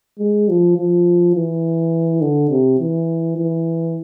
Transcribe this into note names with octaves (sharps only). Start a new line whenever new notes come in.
G#3
F3
F3
E3
D3
C3
E3
E3